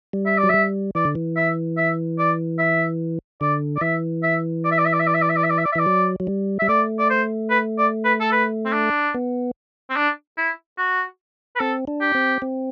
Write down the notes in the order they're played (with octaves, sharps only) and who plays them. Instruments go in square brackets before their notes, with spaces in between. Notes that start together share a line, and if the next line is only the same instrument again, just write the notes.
[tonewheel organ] G3
[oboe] E5
D5
[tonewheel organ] F#3
[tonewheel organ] G3 [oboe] E5
[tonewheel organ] E3 [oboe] D5
[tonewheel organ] D3
E3
[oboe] E5
E5
D5
E5
[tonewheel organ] D3 [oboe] D5
[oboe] D5
[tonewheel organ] E3 [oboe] E5
[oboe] E5
D5
E5
D5
E5
D5
E5
D5
E5
D5
E5
D5
E5
D5
E5
D5
E5
[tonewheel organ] E3 [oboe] D5
[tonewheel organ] F#3
F#3
G3
[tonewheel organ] G3 [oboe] E5
[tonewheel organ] A3 [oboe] D5
[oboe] D5
C5
B4
D5
B4
A4
B4
C4
D4
[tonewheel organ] B3
[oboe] C4
D4
E4
F#4
B4
[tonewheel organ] C4 [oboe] A4
[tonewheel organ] D4
[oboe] G4
[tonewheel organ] C4
C4